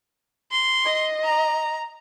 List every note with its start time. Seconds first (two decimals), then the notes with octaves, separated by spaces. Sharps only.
0.52 C6
0.85 D#5
1.24 A#5